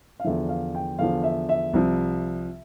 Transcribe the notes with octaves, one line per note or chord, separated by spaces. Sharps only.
F5
E2 D3 F3 E5
F5
G5
E2 D3 F3 F5
E5
E5
C2 C3 F3